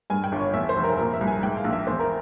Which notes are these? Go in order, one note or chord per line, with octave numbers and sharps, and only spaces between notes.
G2 G#5
G5
G1
C#5
E2 E5
C5
F1
A#4
A#2 A#4
E5
C2
G#5
G#2 G5
F5
A#1
E5
E2 C5
A#4